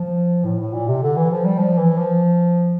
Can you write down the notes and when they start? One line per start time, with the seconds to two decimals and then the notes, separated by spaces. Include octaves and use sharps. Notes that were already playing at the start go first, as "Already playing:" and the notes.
Already playing: F3
0.45 A2
0.59 A2
0.73 A#2
0.88 C3
1.02 D3
1.16 E3
1.30 F3
1.45 G3
1.59 F3
1.78 E3
1.98 F3